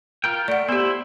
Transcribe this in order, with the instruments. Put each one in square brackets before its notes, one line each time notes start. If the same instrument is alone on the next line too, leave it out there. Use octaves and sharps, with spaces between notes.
[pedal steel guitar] F4 A#4 G5
[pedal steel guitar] A3 [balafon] D5 F#5
[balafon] B3 G4 [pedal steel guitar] E4 C5